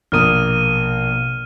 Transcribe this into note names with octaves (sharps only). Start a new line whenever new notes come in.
A#1 B2 A#3 D#6 F6 D#7